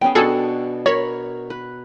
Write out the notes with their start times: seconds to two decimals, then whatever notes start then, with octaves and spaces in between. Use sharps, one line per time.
0.01 B3 C#4 G#4 G5
0.15 B2 D4 F#4 G#4 A4
0.86 A#4 C#5 B5
1.50 B4